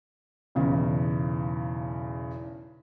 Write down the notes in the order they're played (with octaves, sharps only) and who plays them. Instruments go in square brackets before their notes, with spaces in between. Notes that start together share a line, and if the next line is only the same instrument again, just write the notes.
[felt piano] B1 E2 C#3